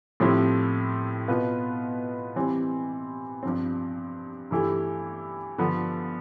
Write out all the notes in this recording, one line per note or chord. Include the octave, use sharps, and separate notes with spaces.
A2 F3 C4 E4 G4
B2 B3 F4 B4
E3 G3 C4
G2 F3 C4
G2 E3 A3 E4 G4
G2 D3 F3 B3